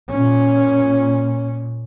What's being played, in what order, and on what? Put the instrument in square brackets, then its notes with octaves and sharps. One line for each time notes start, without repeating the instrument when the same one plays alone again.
[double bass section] A#2 C#4